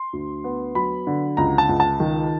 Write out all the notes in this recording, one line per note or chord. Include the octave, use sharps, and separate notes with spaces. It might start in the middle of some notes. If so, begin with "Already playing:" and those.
Already playing: C6
D2
B3
F#3 B5
D3
C#2 A#5
A5
C#2
A5
D#3